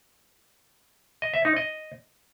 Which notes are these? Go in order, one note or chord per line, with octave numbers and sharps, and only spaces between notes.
D#5
E5
D#4
D#5